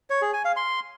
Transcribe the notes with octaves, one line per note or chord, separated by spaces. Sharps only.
C#5
G#4
G#5
F5
C6